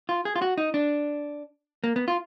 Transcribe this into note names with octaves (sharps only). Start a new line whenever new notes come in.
F4
G#4
F4
F#4
D#4
D4
A#3
B3
F4